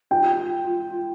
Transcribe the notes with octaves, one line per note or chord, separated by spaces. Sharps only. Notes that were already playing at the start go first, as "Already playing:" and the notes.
F4 G5